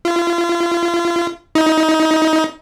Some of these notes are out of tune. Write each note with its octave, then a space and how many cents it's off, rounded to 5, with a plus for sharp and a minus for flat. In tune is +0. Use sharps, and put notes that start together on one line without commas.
F4 -35
D#4 +25